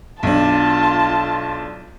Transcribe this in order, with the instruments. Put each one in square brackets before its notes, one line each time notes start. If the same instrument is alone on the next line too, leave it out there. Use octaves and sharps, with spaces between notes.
[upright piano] B1 D4 [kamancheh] F4 A5